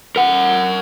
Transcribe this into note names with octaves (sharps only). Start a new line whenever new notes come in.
A#4 F#5